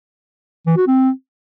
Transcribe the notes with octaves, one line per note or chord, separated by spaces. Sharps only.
E3
F#4
C4